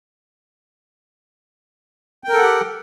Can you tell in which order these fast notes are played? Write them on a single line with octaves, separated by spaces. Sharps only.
G5 A#4 A4 F#5 G4